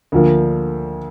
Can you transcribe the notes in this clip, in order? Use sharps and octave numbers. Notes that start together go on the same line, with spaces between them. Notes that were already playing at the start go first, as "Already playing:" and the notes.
D2 D3 F3 A#3